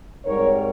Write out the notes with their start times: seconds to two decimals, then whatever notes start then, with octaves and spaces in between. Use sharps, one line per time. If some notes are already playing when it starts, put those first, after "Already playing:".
0.25 G#2 G3 C4 A#4 C#5